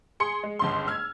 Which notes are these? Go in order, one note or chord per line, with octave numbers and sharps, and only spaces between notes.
G#4 C6 C#7
G#3
G1 C#2 C6
E6 F6 G#6